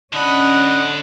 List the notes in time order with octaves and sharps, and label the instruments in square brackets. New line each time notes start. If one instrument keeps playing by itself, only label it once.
[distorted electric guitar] D3 B5 [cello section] C#4 [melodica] D4 [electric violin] D#5 F#5